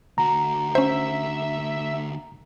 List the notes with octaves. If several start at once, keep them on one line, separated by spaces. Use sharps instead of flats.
D2 F#4 A#5
C#4 C5 E5